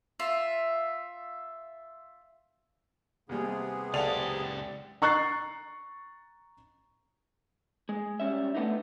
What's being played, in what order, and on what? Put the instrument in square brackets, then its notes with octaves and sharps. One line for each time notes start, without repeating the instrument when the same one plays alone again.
[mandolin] F4 E5
[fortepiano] D#2 G3 [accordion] C3 B3 G#4
[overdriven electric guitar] C#2 G4 [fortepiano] A4 F5 F#5 [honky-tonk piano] D5 F7
[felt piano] A#5 C#6 F#6 A6 C7
[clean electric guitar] G#3
G3 C#4 E5
A3 B3 D4 D#4